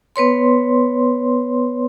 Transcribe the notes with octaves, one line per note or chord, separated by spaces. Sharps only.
B3 B4 C#5 C6